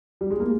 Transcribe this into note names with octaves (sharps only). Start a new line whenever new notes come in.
G3
G#3
A#3